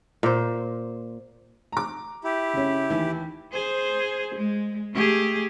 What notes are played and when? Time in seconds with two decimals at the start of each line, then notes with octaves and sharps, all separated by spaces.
0.23 A#2 C5
1.72 A#5 D6
2.24 E4 G4
2.53 C#3 C#4
2.90 D#2 E3
3.52 G#4 C5
4.35 G#3
4.93 A3 G4 G#4